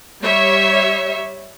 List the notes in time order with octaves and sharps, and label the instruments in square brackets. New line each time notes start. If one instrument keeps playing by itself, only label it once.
[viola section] G3 C#5 E5